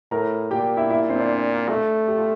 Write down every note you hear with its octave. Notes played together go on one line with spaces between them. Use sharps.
A2 A#4 A#5
A#2 G4 G5
E4 E5
E4 E5
C4 C5
D4 D5
A3
G4
F4